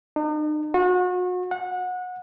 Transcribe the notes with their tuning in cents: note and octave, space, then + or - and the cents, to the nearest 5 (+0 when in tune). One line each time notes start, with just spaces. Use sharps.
D#4 -45
F#4 -35
F#5 -25